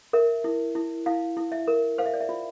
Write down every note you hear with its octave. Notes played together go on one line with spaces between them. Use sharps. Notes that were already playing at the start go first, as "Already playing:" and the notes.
A#4 E5
E4
E4
E4 F5
E4
E5
A#4
C5 F5
E5
D5
E5
F4